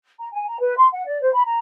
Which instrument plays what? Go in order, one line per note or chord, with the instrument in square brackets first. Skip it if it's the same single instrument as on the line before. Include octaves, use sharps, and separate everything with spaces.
[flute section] A#5
G#5
A#5
B4
C6
F#5
D5
C5
B5
A#5